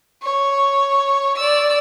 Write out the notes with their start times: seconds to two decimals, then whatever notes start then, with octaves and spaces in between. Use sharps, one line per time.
0.23 C#5
1.37 D5 E6